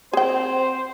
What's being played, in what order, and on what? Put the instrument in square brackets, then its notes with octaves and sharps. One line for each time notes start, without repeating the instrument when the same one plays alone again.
[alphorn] C4 [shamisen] G#4 G5 [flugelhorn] C5